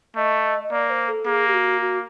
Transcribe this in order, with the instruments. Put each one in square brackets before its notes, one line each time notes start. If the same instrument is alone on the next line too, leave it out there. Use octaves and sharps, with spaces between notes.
[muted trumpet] A3 [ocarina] D#5
[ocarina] D#5
[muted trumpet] A#3 [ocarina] D5
[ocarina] C5
A4
[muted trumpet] A#3 [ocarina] G#4
[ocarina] G4
F#4
F#4